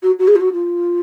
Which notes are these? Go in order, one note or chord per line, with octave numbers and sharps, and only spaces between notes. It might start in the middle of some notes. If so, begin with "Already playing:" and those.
F#4
F#4
G#4
F4
F#4
F4